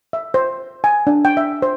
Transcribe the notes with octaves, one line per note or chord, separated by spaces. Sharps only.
E5
C5
G#5
D4
G5
E5
C5